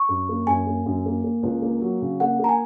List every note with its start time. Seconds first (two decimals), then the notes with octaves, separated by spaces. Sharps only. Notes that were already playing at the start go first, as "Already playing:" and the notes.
Already playing: C#6
0.09 F#2
0.29 A#3
0.47 F#2 G#5
0.67 A#3
0.86 F#2
1.06 A#3
1.24 A#3
1.43 C#2
1.62 A#3
1.81 F#3
2.02 C#3
2.20 A#3 F#5
2.39 A#3 A#5
2.49 G#5